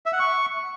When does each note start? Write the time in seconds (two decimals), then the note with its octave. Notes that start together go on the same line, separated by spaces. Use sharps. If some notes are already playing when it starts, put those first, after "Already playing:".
0.06 E5
0.13 F#5
0.20 C#6